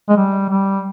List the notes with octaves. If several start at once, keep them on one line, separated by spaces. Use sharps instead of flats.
G#3
G3
G3